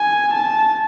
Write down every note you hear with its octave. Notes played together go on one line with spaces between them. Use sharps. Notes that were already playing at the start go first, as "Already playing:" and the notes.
Already playing: G#5
A5